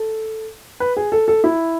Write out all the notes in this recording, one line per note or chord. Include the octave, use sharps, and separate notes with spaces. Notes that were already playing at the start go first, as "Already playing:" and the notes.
Already playing: A4
B4
G#4
A4
A4
E4